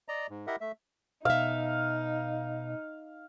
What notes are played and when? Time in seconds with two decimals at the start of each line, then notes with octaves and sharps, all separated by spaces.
0.08 D5 D#5 A#5
0.30 G#2
0.47 E4 G4 A#4 D#5 E5 F#5
0.61 A3 E5
1.25 B2 D#4 E5 F5